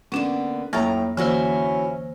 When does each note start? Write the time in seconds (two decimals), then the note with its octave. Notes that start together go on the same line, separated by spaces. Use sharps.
0.12 D3 A#3 B3 C#4 D4
0.73 F2 A2 F#3 A#3 G5 A#5 C#6 A6
1.17 D3 E3 A#3 C#4 E4 F#4 C5 E5